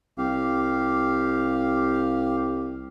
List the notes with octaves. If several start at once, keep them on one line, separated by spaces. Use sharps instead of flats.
C2 G4 F5